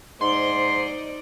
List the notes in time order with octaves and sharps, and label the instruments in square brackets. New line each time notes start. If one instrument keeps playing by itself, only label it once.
[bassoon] G#2 [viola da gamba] D#4 C5 D5 [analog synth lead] C6